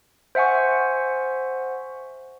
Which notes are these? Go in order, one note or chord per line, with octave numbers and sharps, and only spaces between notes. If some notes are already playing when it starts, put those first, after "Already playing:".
C5 E5 F#5 G#5 C#6